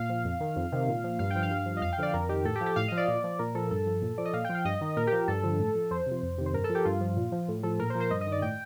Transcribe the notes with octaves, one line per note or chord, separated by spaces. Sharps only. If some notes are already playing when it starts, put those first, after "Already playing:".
Already playing: A#2 F5
F3
F2
D#3
F2
C3 D#3
A#2
F3
G2 F5
F3 G5
F5
G2
F3
D#5
F2 F5
G5
D3 F3 D5
F2 A#4
D#3 G4
A2 A4
G4
F3
G4
A2 F5
F3 D#5
D5
A#2
F3
A#2 A#4
F3 A4
G2 A4
F3
A#2
F3 D5
D#5
A#2 F5
F3 G5
F5
G2 D#5
D#3
A#2 A#4
G4
F3
G4
G2 A4
D3 F3
A2
F3
F2 C5
C3 F3
F2
C3 D#3
C5
G2 A#4
A4
F3
G4
G2 F4
F3
A#2
F3
A2
F3 A4
A#2 A#4
C5
F3
C5
G2 D#5
D#5
D#3
D5
A2 G5